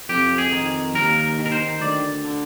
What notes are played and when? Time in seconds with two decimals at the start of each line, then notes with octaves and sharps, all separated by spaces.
0.09 F2 G4
0.38 G#4
0.52 D#3
0.95 D#2 A#4
1.39 D#3
1.46 A#4
1.52 C5
1.80 D2 D5
2.24 D3